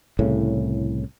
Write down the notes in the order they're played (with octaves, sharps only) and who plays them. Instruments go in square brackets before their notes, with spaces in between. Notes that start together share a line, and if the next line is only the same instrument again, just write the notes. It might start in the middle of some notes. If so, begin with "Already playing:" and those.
[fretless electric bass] C2 A2 C#3